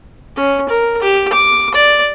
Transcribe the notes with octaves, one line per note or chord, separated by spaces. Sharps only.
C#4
A#4
G4
D6
D5